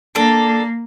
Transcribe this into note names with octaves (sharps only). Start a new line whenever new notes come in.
A#3 D4 A4